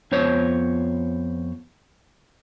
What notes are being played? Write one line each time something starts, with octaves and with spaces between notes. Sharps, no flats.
F2 B3 C5 C#5